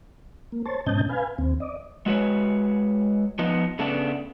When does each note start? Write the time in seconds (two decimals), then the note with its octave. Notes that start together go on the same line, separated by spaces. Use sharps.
0.52 A#3
0.66 C5 C#5 A5
0.86 G#2 B2 C#4 D#5 A5 G6
1.09 B4 F5 G#5
1.38 D#2 C4
1.60 D5 D#5
2.06 G#3 F#4 B4 C#5
3.39 F3 B3 D#4
3.79 C#3 A3 B3 D4